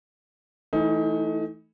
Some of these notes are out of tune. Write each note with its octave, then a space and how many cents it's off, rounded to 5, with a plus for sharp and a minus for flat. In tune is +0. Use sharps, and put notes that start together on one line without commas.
E3 +0 A3 +0 D#4 +25